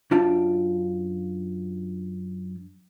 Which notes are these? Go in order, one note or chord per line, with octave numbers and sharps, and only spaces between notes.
F#2 D4 F4 G5 A5